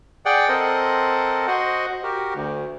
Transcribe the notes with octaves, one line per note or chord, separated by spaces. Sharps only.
G#4 D5 F#5 G5
C4 A4 A#4 C5 D#5 F#5
F#4 C5 D#5 F#5
F#4 G4 A#4
D2